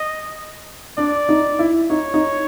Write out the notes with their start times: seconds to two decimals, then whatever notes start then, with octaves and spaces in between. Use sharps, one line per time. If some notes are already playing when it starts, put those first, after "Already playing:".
Already playing: D#5
0.98 D4 D5
1.29 D#4
1.59 E4
1.90 D#4 C#5
2.14 D#4